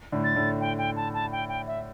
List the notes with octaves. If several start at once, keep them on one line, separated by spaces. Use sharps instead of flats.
A2 D3
A6
A2 D3
G5
G5
A5
A5
G5
G5
E5